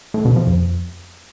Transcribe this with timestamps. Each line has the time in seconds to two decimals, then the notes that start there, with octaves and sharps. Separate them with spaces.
0.14 A2
0.25 B2
0.36 F3
0.47 F2